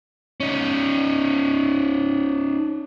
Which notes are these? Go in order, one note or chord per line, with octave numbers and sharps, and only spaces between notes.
C#4 D#4